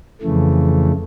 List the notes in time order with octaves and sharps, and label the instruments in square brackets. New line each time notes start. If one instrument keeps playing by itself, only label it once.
[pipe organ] F2 C#3 E3 A3